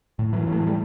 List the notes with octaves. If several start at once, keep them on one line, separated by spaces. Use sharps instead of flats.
A2
E3 F#3
A2
A3
G#3
G3